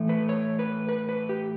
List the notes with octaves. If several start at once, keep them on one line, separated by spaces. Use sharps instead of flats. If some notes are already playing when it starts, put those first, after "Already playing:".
Already playing: A2 E3 A3
B4
C#5
B4
B4
B4
G4